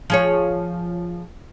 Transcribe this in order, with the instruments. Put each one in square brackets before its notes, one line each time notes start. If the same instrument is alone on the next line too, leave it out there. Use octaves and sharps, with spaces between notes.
[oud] F3 G#4 C#5